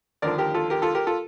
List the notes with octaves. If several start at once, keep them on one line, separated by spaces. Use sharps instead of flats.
D#2 D3 F3 A#4 D5
G4 A#4
F4 A4
G4 A#4
F4 A4
G4 A#4
F4 A4